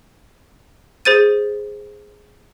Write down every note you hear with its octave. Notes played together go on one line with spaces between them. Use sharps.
G#4 C5 A6 D#7